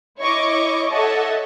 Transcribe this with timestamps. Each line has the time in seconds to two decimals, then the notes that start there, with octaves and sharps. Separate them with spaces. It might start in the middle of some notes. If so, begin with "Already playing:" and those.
0.19 E4 C#5 D#5 C#6 D6
0.93 A4 C#5 D#5 E5 F#5 A5